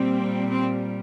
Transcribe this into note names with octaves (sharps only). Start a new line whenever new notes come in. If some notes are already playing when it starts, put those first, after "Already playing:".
Already playing: A#2 G3 C4
C4